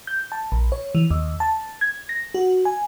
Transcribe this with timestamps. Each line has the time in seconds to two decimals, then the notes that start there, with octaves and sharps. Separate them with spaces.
0.07 G6
0.32 A5
0.52 A#1
0.72 C#5
0.95 E3
1.11 D#2
1.40 A5
1.81 G#6
2.09 A#6
2.34 F#4
2.65 G#5